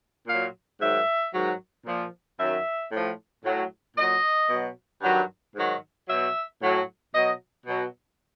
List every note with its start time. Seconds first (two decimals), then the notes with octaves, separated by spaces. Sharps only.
0.27 A#2 F#3 F5
0.81 G#2 D#3 F#3 E5
1.33 G#2 D#3 F#3
1.86 A#2 F3
2.39 F#2 D#3 F#3 E5
2.92 A2 F3
3.44 A2 F#3
3.97 A#2 F#3 D#5
4.50 B2 F#3
5.02 G2 D#3 F#3
5.55 G#2 D#3 F#3
6.08 B2 F#3 E5
6.61 A2 F#3
7.13 B2 F#3 D#5
7.67 B2 F#3